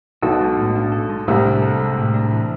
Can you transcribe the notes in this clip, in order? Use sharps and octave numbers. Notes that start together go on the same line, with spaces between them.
B1 B2 A4
G#3
A2
D4
A4
G#3
C2 A2 C3
D4
A4
G#3
A2
D4
E3